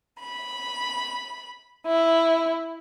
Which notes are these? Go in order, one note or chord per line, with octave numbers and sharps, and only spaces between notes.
B5
E4